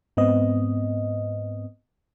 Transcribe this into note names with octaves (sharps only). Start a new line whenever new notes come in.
G#2 B3 C4 D#5